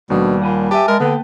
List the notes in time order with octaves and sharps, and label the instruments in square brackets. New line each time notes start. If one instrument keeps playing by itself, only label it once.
[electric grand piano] D#2 [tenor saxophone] B2 [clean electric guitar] F3 D4 A4 [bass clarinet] G3
[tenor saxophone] A#2 [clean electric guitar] F#5 G#5 B5
[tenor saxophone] G4 [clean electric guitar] B4 E5 G#5 [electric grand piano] A5
[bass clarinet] G#3 [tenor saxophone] A#4
[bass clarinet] D3 [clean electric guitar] A#3 B4 G5 [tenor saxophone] B3